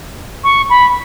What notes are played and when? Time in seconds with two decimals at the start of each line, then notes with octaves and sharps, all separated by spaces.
0.44 C#6
0.70 B5